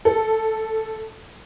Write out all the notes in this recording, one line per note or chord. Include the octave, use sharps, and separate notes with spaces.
A4